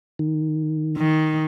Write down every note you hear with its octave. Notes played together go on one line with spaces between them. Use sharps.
D#3
D#3